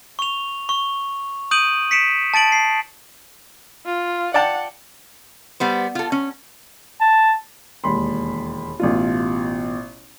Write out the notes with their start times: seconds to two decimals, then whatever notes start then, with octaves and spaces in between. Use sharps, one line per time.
0.19 C#6 F7
0.69 C#6
1.51 D#6 G6 D7 D#7 F#7
1.91 B6 C#7 D7 E7
2.34 A5 A6 D7 F#7
2.52 C7
3.85 F4
4.34 D5 F#5 G5 A5
5.60 G3 B3 C5
5.95 F4 A4
6.12 C#4
7.00 A5
7.84 E1 D#2 B5 C6
8.80 A1 B2 F4